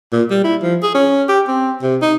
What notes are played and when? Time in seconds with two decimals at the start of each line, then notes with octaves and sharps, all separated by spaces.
0.12 A#2
0.30 G3
0.44 E4
0.62 F3
0.83 G#4
0.95 C#4
1.29 G4
1.48 C4
1.82 C3
2.02 D#4